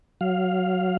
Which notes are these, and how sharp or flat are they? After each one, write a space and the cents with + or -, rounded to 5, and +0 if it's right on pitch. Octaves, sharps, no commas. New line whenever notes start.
F#3 +0 F5 +0